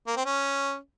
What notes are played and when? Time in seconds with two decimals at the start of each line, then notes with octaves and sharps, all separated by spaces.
0.07 A#3
0.16 C4
0.26 C#4